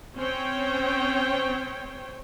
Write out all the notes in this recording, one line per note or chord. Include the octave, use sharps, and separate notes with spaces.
C4 C#4 C5 C#5 G5